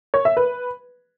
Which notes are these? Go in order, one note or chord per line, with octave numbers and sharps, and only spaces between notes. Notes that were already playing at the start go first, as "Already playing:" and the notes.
C#5
E5
B4